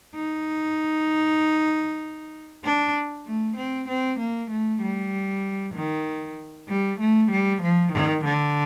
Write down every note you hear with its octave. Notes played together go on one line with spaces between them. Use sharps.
D#4
D4
A3
C4
C4
A#3
A3
G3
D#3
G3
A3
G3
F3
D#3
D3